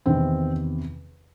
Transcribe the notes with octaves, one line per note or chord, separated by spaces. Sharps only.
E2 C3 D#3 C4